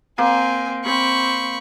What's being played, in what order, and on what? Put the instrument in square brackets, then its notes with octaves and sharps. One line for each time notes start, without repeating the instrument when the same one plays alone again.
[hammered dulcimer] A#3 [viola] C4 [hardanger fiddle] G#5
[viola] C4 [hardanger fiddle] B5 C#6